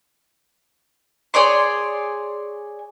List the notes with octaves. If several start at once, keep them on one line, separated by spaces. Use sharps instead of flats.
G#4 C#5 D5 C6